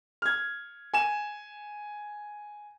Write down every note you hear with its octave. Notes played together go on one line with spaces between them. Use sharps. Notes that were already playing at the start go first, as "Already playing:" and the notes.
F6 G#6
G#5 E7